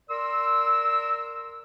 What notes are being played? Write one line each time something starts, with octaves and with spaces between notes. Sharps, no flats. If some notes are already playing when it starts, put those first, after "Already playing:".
A#4 D5 C6 E6